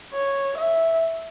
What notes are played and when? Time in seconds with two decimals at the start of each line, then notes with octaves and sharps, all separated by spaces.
0.14 C#5
0.58 E5